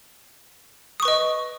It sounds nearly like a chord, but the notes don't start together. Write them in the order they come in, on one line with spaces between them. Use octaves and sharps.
D#6 C#6 B4 D#5